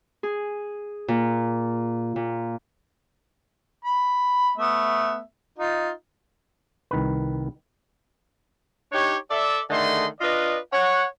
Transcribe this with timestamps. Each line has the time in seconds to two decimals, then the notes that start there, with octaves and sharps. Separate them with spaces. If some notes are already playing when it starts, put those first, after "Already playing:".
0.23 G#4
1.08 A#2
2.16 A#2
3.84 B5
4.57 A3 B3 E5
5.59 D#4 F4
6.91 C2 D#3 B4
8.92 D4 D#4 G4 C#5
9.31 A4 D5 E5
9.70 D3 D#3 A3 G#4 D#5 C6
10.20 D4 F4 B4 D5 D#5
10.73 C#5 F#5